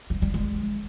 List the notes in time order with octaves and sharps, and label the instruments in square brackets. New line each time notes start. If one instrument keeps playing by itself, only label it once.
[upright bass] G3
G3
G#3